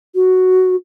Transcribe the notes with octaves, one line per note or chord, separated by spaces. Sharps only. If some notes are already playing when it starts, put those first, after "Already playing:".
F#4